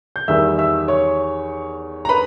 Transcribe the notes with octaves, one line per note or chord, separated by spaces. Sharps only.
G6
E2 D#3 G3 E5 E6
E5 E6
C#5 C#6
A#5
B4 B5